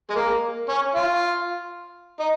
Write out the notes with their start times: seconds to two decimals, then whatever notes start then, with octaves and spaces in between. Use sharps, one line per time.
0.10 G#3
0.16 A#3
0.69 C#4
0.95 F4
2.20 D#4